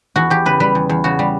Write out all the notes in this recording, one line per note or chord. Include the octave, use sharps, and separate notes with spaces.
E2 F#4
E2 G4
C#3 B4
G3 B4
E2
E2
C#3 F#4
G3